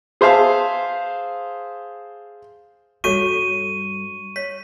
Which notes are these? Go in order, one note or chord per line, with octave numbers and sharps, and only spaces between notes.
G#4 C5 E5 F5 A5
G2 G3 F#4 A4 C#5 C#6 D#7
C#5 B6